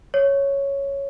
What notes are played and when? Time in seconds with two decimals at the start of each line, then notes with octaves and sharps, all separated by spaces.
0.14 C#5